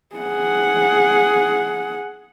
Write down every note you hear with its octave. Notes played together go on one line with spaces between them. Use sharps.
G#4 F#5